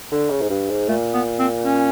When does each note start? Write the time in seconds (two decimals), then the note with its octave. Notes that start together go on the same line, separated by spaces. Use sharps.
0.12 D3
0.30 C#3
0.42 G#2
0.50 G2
0.70 G#2
0.88 A#2 A3
1.14 B3
1.39 C4
1.64 C#4